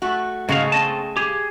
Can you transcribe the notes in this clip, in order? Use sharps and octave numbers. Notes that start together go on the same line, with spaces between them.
A3 F#4
G#2 C#3 G#3 A3 F#4 F5
C4 D#5 A5
G4 G#4